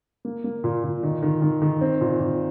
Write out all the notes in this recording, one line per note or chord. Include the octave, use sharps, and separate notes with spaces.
A#3
A#3
A#2
A#2
D#3
D#3
D#3
D#3
C4
A#2
A#2